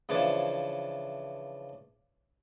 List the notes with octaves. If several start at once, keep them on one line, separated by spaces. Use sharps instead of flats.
C#3 E3 F3 D4 A5